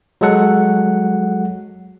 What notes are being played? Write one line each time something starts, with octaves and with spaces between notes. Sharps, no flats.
F#3 G#3 A4 F#5